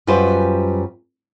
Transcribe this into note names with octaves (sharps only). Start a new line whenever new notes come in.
F#2 G3 F4 B4 C5